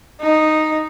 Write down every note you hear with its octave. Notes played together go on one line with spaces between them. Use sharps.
D#4